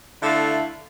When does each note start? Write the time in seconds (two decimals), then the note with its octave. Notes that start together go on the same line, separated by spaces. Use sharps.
0.22 D3 A3 E4 F5